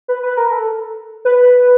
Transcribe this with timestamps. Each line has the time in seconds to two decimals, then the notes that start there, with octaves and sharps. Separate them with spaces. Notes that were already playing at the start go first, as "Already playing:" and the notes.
0.08 B4
0.23 B4
0.37 A#4
0.52 A4
1.25 B4